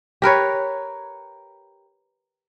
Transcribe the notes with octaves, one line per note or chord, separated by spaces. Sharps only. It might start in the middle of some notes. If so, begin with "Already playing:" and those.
G4 A#4 B4 C#5